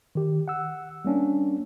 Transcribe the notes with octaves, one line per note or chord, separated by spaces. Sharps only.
D#3 G4
F#5 E6
G3 A#3 C#4 D4